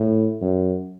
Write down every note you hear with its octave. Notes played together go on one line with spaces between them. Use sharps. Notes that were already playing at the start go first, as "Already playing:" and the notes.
Already playing: A2
F#2